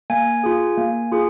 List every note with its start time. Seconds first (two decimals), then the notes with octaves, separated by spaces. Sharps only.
0.10 A#3 G#5
0.44 F4 G#4
0.78 A#3
1.12 F4 G#4